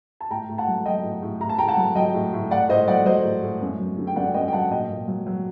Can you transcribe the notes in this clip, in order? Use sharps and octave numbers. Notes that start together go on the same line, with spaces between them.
A5
A2 G5 A#5
A2
F#5 A5
F#3
F#3 D#5 G5
A2
A2
A2 A#5
A5
A2 G5 A#5
F#5 A5
F#3
F#3 D#5 G5
A2
A2
A2 D5 F#5
A2 C5 D#5
F#3 D5 F#5
F#3 C5 D#5
A2
A2
F#2
F#3
D3
G5
F#2 D5 F#5
F#2 D#5 G5
G5
F#3 F#5 A5
A#2 D#5 G5
A#2
F#3
F#3